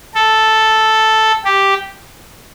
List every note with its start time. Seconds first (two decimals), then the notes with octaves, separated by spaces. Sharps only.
0.15 A4
1.44 G4